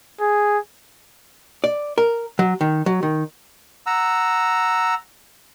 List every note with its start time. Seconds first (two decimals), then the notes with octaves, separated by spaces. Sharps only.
0.21 G#4
1.64 D5
1.98 A#4
2.39 F#3
2.61 D#3
2.86 F#3
3.03 D#3
3.86 F#5 A#5 E6